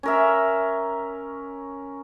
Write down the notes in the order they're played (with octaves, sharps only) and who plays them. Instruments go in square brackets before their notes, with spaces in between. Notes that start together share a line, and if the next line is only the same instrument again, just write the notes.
[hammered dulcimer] C#4 A#4 E5